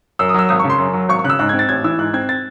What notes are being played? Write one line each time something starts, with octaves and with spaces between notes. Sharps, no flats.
F#2 E6
D#6
F#3 E6
G#1 D#6
C#6
C#3
C6
F#2
F#3
G#1 C#6
C#6
C#3 F#6
E6
G#2 F#6
G#6
C4
A6
A1 G#6
E3 E6
G#2 F#6
C4 G#6
A6